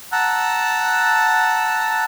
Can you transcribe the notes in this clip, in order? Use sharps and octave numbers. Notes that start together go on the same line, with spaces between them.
F#5 A5 A#5 E6 F#6